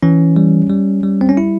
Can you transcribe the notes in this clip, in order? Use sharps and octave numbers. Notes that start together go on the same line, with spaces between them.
E3 C#4
G3
G3
G3
C4
C#4
E4